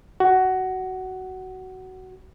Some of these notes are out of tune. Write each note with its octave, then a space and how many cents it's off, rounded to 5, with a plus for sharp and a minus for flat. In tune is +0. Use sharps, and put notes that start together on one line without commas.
F#4 +15